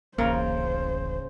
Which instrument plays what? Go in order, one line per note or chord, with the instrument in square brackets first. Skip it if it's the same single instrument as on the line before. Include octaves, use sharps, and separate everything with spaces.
[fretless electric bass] D1 A1 [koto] C#3 [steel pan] A#3 A#4 [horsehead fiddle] C5